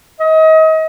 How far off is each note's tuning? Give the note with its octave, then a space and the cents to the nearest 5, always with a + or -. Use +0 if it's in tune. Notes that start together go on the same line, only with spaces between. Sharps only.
D#5 +35